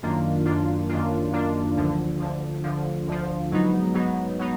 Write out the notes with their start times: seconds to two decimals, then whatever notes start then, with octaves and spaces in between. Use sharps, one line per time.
0.02 F#2 D#3 A#3 D4 F4
0.45 F#2 D#3 A#3 D4 F4
0.89 F#2 D#3 A#3 D4 F4
1.33 F#2 D#3 A#3 D4 F4
1.76 D2 D3 F3
2.20 D2 D3 F3
2.64 D2 D3 F3
3.07 D2 D3 F3
3.51 G#2 F#3 B3 D#4
3.94 G#2 F#3 B3 D#4
4.39 F#3 B3 D#4